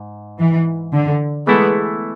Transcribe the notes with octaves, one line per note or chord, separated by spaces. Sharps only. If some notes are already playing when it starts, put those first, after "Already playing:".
Already playing: G#2
E3
D3
E3 G#3 A3 B3 E4 A4